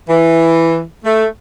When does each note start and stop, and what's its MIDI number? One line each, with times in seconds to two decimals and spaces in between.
0.09 0.80 52
1.05 1.26 57